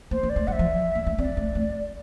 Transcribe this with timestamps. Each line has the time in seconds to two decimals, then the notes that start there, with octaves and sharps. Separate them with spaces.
0.11 A#3 C5
0.23 A#3
0.29 D5
0.36 A3
0.47 G3 F#5
0.52 E5
0.59 F3
0.95 A#3
1.07 A3
1.18 C4 D5
1.37 A3
1.55 A3